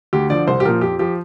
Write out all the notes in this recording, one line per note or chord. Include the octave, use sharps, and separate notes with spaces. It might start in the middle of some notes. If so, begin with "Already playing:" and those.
D2 G4
D3 F3 D5
C2 C5
G4
A#2 F3 A#4
F2 G4
F3 G4